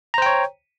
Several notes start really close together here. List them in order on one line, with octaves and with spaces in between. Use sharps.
A#5 C5 G5 C#5